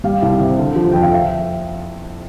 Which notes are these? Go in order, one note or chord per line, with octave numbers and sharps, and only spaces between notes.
G3 F5
C2
C3
D3
F3
F2 G5
F5
E5